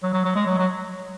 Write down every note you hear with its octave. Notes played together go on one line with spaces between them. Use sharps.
F#3
F#3
F#3
G#3
F#3
F#3